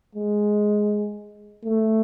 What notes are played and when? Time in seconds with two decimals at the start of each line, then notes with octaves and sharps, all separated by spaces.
0.15 G#3
1.64 A3